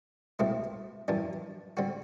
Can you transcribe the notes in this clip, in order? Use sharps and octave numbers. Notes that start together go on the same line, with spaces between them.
C2 B2 A3 C4 E4
F#2 E3 G3 D4
D3 G3 C4 F#4